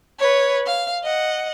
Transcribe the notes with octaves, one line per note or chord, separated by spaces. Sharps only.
B4 C#5
F5
D#5 F#5